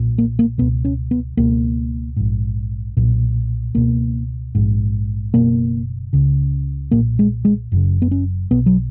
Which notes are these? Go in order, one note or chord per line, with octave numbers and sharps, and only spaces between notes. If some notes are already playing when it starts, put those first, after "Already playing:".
Already playing: B1 A#2
A#3
A#3
C#2 B2 B3
C#4
B3
C#2 B2 A#3
A#1 G#2
B1 A#2
C#2 B2 A#3
A#1 G#2
F#1 E2 B2 A#3
C#2 C#3
B1 A#2 A#3
G#3
G#3
F#1 F#2 C#3
B3
C#4
B1 B2 B3
F#3